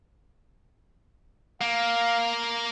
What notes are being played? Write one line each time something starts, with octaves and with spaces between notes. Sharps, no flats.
A#3 F5